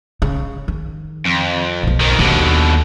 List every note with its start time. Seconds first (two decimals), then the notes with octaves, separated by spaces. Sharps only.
0.22 C#3
0.68 D#3
1.25 F2
1.83 B1 B2
2.00 F2 D#3
2.19 D#2 B2 D3 D#4